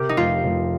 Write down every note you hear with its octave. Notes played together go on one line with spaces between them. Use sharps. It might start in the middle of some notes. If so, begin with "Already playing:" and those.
Already playing: C3 G4 A#4
D#4
F1 F4
F1